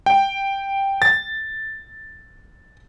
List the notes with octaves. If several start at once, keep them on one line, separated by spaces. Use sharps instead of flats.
G5
A6